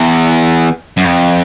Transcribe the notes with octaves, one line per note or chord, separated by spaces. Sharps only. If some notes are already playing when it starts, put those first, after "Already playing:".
Already playing: E2
F#2
F2